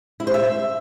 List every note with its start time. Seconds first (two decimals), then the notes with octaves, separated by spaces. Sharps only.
0.20 E4
0.27 C5
0.34 E5